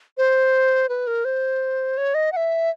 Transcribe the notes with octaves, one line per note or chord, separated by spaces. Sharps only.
C5
B4
A#4
C5
C#5
D#5
F#5
E5